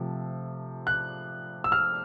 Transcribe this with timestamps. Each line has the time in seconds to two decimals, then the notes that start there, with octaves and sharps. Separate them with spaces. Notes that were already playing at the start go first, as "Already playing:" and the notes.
Already playing: C3 F3 A3
0.87 F#6
1.64 E6
1.72 F6